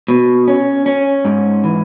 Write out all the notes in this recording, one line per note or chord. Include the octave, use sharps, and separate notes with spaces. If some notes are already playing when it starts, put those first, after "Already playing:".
B2
C#4
C#4
G#2
E3